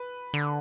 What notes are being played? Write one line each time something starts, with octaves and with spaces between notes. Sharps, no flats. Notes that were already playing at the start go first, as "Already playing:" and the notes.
Already playing: B4
D3